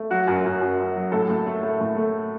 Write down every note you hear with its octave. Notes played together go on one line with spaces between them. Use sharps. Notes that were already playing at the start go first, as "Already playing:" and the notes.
Already playing: A3
F#3 F#4
F#2
F#2
F#2
F#2
F#3
A2 A4
A2
A3
A3
A2
A3